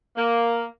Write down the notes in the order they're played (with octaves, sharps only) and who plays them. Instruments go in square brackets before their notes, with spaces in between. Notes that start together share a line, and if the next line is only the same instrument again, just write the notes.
[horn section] A#3